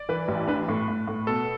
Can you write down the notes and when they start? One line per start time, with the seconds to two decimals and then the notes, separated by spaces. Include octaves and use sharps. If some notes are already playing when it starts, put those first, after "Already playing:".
Already playing: D5
0.09 E3 B4
0.28 A1
0.48 D4 B4
0.68 A2
0.88 A2
1.07 A2
1.27 B2 A4